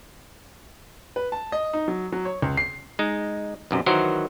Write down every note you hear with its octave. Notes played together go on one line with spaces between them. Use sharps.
B4
A5
D#5
D#4
F#3
F#3
C#5
C#2
C7
G#3 D#4
B1 F#2 C3
D#3 E3 F#3 F#4 A#4 C5